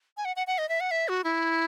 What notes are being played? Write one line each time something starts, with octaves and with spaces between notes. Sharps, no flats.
G#5
F#5
F#5
F#5
D#5
E5
F#5
E5
F#4
E4